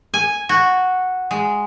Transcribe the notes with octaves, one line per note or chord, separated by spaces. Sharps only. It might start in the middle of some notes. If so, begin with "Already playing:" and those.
G#5
F#4
G#3